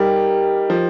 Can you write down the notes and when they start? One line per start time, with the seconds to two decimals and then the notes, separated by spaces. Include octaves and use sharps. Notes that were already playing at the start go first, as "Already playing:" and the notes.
Already playing: G3 D#4 G4 A#4
0.70 F3